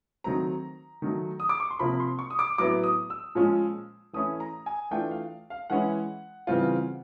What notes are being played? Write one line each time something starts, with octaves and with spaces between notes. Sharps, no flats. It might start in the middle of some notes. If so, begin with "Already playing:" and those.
D#3 F#3 A3 C4 A#5
D#3 F#3 A3
D#6
D6
C#6
C6
C3 F3 A#3 B5
C6
C#6
D#6
D6
A2 F#3 B3 E4 D6
D#6
E6
A#2 F3 G#3 C#4 F4
E3 A3 C#4 E4 D#6
A#5
G#5
E3 A3 D4 F4 G5
F5
F5
E3 G#3 C#4 E4 F#5
C#3 E3 G3 C4 F4